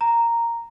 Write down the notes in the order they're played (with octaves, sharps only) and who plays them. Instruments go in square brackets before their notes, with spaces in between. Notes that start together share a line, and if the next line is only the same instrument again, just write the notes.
[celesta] A#5